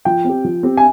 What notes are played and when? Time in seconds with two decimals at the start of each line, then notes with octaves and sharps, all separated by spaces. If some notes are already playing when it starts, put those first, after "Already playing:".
0.05 F3 G5
0.25 C4 G4
0.44 F3
0.63 C4 G4
0.77 G#5